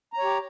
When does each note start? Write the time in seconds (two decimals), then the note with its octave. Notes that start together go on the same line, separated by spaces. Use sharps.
0.13 A#5
0.18 C#5
0.23 G4